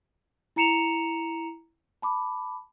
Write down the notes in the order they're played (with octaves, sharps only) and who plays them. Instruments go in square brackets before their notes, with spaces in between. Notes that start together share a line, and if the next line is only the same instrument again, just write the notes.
[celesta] E4 A#5 C#7 E7 F7
A5 B5 D6